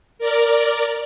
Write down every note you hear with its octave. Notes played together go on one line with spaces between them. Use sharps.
A#4 D5